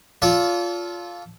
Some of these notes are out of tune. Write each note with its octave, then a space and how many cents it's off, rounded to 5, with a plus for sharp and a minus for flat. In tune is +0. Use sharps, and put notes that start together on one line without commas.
F4 +0 A4 -15 D5 -40